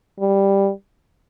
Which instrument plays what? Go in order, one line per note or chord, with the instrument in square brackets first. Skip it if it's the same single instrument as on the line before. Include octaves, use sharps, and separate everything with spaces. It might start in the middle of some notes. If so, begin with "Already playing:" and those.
[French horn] G3